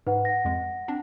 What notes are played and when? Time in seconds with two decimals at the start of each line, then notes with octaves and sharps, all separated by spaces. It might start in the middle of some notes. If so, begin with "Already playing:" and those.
0.07 G#2 B4 F#5
0.25 F#5 A#6
0.45 F2 G#3
0.88 C4 D4